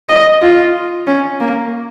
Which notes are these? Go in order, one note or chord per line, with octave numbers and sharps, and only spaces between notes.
D#5
F4
C#4
A#3